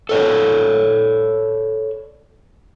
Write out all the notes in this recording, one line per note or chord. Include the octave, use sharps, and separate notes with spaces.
A4 C#5 D5